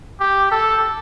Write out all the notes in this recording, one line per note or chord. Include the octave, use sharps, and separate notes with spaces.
G4
A4